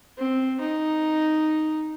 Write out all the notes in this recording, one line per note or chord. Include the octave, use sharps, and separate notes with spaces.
C4
D#4